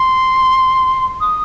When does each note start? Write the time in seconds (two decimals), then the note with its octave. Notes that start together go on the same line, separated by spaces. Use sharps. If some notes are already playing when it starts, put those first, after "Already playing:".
Already playing: C6
1.21 D#6